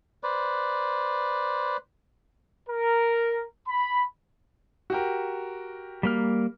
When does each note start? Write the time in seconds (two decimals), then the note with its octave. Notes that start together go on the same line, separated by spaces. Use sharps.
0.23 B4 C5 D5
2.69 A#4
3.67 B5
4.90 F#4 G4 A#4
6.03 G3 A#3 F6